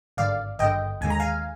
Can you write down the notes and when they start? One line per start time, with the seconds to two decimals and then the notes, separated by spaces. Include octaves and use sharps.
0.17 G#1 G2 D3 D5 F5
0.59 G#1 G2 D3 D#5 G5
1.01 D#2 D3 G#3 G#5
1.10 A#5
1.20 F5 G#5